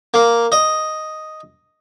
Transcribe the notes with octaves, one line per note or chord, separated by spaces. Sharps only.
A#3
D#5